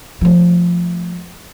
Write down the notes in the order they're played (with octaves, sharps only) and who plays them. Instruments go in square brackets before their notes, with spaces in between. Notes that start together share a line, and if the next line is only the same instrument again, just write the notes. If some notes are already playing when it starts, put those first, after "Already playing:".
[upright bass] F3 A3